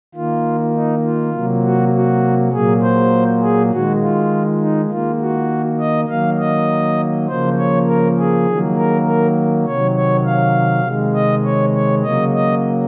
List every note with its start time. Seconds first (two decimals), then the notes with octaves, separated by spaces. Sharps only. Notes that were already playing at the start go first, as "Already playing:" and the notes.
0.14 D#3 A#3 F4
0.74 D#4
1.04 F4
1.34 C3 F#3 A#3
1.63 F#4
1.93 F#4
2.52 A#2 F#3 A#3 G#4
2.82 C5
3.42 G#4
3.71 D#3 G#3 F#4
4.01 F4
4.61 D#4
4.90 D#3 A#3 F4
5.20 F#4
5.80 D#5
6.09 D#3 F#3 A#3 F5
6.39 D#5
7.28 C#3 F3 A#3 C5
7.58 C#5
7.87 A#4
8.17 G#4
8.47 D#3 F#3 A#3
8.77 A#4
9.06 A#4
9.66 C3 D#3 F#3 C#5
9.96 C#5
10.26 F5
10.85 C3 D#3 G#3
11.14 D#5
11.44 C#5
11.74 C#5
12.03 C#3 F#3 A#3 D#5
12.34 D#5